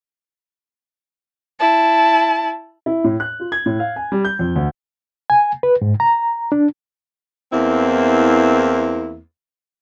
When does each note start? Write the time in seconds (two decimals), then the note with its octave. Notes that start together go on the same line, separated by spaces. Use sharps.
1.60 E4 A5
2.86 E4
3.04 A2
3.20 F#6
3.40 F4
3.52 G#6
3.66 A2
3.80 F5
3.96 G#5
4.12 G3
4.25 G6
4.39 F2
4.55 D2
5.30 G#5
5.63 B4
5.82 G#2
6.00 A#5
6.52 D4
7.52 E2 A#3 C4 E4